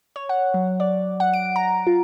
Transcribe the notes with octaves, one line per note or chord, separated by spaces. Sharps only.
C#5
F#5
F#3
D5
F#5
D7
A#5
F4